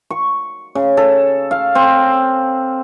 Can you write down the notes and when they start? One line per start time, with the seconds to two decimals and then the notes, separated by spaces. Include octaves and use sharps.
0.10 C#6
0.75 C#3
0.97 A4
1.51 F5
1.75 C4